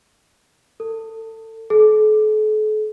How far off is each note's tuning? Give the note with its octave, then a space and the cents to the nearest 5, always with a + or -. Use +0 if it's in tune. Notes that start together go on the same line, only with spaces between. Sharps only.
A4 +25
A4 -40